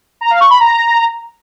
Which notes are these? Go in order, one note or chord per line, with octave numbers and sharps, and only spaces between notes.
A#5
F5
C#6
B5
A#5